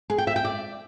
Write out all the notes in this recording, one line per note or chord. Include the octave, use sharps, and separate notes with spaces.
G#4
G5
E5
G5
D5